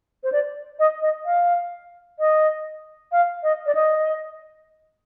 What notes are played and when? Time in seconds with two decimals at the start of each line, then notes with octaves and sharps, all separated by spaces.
0.24 C5
0.32 D5
0.79 D#5
1.02 D#5
1.25 F5
2.19 D#5
3.12 F5
3.43 D#5
3.66 D5
3.75 D#5